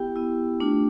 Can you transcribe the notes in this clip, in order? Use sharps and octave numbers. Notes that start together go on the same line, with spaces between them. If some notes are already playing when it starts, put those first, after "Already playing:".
Already playing: B3 E4 G4 G5
B3 E4
A3 D4 F4